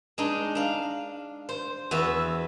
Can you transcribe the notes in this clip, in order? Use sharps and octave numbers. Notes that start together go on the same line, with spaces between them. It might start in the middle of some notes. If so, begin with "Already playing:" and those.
G#3 D4 D#4
D4 F5
C5
E2 F#4 B4 E5